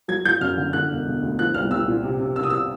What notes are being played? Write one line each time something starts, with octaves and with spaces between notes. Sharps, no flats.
F#3 G#6
F#3 G6
F#2 F6
D3
D3 F#6
E1
E1
D2
F3 F#6
C2 F6
C2 E6
A#2
C3
C3
C3 E6
D#6
E6